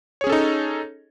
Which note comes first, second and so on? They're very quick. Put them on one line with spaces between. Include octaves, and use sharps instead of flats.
C#5 G#4 C#4 A4 D#4